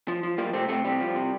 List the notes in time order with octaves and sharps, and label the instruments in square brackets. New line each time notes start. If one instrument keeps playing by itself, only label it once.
[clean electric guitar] F3
F3
F3 G3 A#3
C3 A3 C4
C3 A3 C4
C3 G3
F3
C3